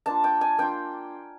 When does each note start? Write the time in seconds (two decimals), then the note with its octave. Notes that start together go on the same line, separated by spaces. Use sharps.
0.06 A#3 D4 F4 A5
0.24 G5
0.41 G#5
0.58 A#3 D4 F4 G5